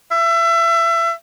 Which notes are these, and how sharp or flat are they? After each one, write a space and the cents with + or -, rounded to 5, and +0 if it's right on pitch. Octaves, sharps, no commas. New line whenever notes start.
E5 +30